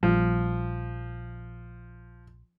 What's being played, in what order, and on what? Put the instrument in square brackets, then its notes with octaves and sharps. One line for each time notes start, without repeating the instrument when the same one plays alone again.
[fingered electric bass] A#1 G3 [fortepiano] F3